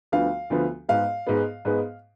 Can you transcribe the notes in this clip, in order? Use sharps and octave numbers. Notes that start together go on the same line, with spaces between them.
D2 D3 F3 B3 F5
D2 D3 F3 B3
G#2 G#3 B3 F5
G#2 G#3 B3
G#2 G#3 B3